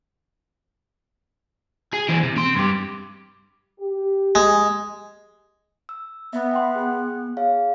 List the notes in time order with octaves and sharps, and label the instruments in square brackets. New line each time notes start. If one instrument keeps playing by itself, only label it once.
[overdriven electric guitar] G#4
E3 C4
C3
C4 C6
G2 G4
[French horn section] G4
[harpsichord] G#3
[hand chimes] E6
[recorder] B3 [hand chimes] E5 B5
[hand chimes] F#5 G5 C6
G#4 F#6
G#4 C#5 F5